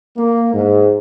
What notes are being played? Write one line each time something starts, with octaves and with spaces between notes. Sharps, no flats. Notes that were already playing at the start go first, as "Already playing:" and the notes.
A#3
G#2